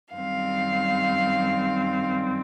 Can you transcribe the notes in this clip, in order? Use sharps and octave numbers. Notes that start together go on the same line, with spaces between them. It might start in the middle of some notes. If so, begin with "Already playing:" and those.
F#2 D#3 G3 C4 F5